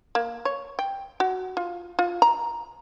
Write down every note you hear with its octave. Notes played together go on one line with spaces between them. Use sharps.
A#3
C#5
G5
F#4
F4
F4
A#5